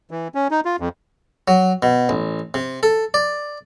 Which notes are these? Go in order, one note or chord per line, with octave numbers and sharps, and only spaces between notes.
E3
C#4
D#4
F4
F2
F#3
B2
A1
C3
A4
D5